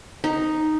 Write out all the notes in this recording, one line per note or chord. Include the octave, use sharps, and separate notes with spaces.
D#4